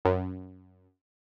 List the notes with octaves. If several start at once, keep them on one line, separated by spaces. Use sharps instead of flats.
F#2